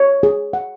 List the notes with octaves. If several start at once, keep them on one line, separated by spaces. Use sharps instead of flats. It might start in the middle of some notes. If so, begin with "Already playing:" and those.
Already playing: C#5
G#4
F#5